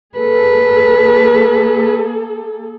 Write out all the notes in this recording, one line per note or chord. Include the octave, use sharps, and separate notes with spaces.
A#3 G#4 A4 B4